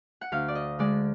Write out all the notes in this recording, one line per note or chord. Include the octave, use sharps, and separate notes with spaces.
F#5
D2 F5
D5
D#5
D3 G#3 D5